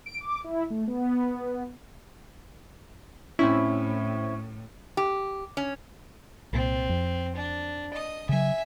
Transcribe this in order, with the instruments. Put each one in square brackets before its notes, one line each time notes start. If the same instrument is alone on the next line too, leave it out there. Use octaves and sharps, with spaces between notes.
[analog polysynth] D7
D6
E4
A3
B3
[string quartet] A2 [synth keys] C4 E4 [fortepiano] C#4
[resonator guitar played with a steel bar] G4
C#4
[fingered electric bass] C2 A#2 [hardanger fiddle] C4
[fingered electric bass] F2
[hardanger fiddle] D4
D#5 D#6
[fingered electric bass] C#3 F#3 [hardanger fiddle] E5 G#5